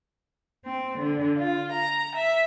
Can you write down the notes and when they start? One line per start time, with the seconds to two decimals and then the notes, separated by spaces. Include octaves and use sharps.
0.65 C4
0.99 D3
1.38 F4
1.72 A#5
2.15 E5